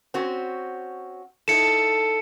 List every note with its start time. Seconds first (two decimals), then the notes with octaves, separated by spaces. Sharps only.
0.14 C4 C#4 F#4
1.48 D#4 E4 A4 C#7 E7